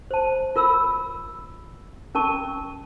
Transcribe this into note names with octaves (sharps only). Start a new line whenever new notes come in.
C5 A5
F4 A#4 B5 E6
C#4 A#4 A5 C#6